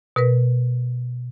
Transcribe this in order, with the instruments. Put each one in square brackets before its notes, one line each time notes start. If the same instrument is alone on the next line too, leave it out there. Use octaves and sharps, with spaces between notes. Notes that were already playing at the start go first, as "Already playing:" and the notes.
[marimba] B2 A#4 B4